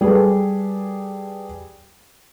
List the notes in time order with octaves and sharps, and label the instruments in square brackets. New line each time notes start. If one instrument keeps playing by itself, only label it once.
[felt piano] G3 G#4 A4 B4